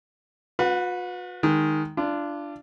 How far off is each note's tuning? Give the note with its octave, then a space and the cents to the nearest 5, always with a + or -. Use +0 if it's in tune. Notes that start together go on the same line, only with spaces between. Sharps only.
F#4 -45 B4 +0 F#5 +0
D#3 +0 G#3 +0
D4 +0 F4 -30